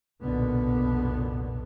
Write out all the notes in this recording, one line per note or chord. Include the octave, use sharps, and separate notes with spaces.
F1 B1 A#2 D3 B3